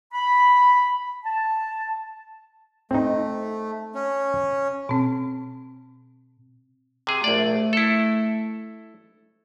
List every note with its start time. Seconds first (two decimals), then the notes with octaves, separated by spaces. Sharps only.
0.13 B5
1.25 A5
2.91 A3 C4 D#4
3.95 C#4
4.89 B2 C4
7.07 C3 G#4
7.24 A#1 A3 D5
7.73 E4 A4